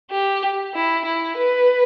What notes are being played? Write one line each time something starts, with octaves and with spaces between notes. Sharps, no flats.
G4
E4
E4
B4